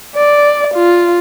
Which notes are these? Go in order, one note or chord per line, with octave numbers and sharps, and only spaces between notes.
D5
F4